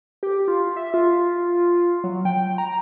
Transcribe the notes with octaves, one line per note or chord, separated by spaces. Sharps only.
G4
F4
E5
F4
F#3
G5
A#5